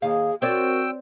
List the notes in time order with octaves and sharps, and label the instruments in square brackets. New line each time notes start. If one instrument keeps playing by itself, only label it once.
[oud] D#2 F5 [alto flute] G#4
[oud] C4 C#5 D5 [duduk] F#4 [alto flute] A#4 [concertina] G5 E6